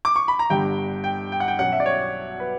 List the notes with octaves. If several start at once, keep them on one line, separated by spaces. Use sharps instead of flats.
D6
C#6
B5
A#5
G1 G2 D3 G5
G5
G5
F#5
G5
B1 B2 F#3 C#4 F#5
E5
D5
C#5
B4